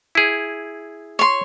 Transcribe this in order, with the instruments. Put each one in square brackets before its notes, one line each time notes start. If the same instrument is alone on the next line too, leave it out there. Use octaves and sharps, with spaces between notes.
[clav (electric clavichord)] E4 G#4
[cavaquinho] C#5 C6